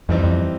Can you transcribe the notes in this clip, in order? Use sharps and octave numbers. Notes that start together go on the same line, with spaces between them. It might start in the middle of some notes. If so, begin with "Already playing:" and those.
F2 E3 G3 C4 D#4
F2